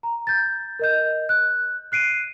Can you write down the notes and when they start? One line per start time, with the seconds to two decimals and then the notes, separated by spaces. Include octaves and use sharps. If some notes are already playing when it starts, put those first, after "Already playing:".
0.03 A#5
0.27 G6 A6
0.79 A#4 D#5 G6
1.29 F#6
1.92 F#6 C7 D7 D#7